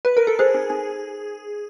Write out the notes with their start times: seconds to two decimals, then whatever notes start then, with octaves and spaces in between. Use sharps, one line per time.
0.05 B4
0.17 A#4
0.27 A4
0.39 G#4 C5
0.54 D#4
0.70 D#4